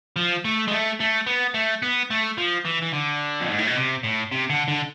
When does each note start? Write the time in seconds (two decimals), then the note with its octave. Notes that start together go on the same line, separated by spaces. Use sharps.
0.16 F3
0.45 A3
0.68 G#3
0.72 A3
1.00 A3
1.27 B3
1.54 A3
1.82 B3
2.10 A3
2.38 F3
2.65 E3
2.82 E3
2.93 D3
3.40 F2
3.50 G#2
3.58 A2
3.67 B2
3.76 C3
4.03 A2
4.32 C3
4.50 D3
4.68 D3